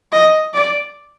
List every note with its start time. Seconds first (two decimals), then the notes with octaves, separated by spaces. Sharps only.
0.12 D#5
0.54 D5